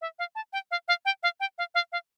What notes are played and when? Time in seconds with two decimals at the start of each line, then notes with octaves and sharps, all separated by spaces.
0.01 E5
0.19 F5
0.35 A5
0.53 G5
0.71 F5
0.88 F5
1.05 G5
1.23 F5
1.40 G5
1.58 F5
1.75 F5
1.92 F5